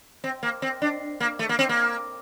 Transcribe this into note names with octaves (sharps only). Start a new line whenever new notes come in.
C4
A#3
C4
D4
A#3
A3
A#3
C4
A#3